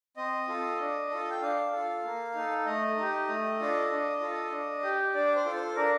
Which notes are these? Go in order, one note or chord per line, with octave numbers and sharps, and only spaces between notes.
C4 D#5
F4 A4
D4
F4 A4
G5
D4 F5
F4 A4
A#3
D#4 A4
A3 D#5
D#4 G4
A3
D4 F4 A4
D4
F4 A4
D4
G4
D4 D5
C5
F4 A4
C5
D4 A#4